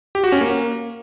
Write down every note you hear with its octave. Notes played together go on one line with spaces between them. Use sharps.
G4
F#4
C#4
A#3